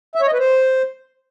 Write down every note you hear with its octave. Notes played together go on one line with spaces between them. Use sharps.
E5
C#5
D#5
B4
C5